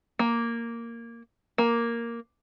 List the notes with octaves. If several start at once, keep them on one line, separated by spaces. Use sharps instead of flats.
A#3
A#3